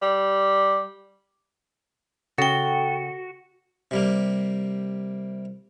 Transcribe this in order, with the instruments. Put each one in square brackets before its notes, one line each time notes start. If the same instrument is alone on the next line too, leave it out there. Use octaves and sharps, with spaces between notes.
[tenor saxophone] G3
[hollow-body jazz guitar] C#3 [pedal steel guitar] F#4 [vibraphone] A4 G5
[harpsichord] C3 G3 A#3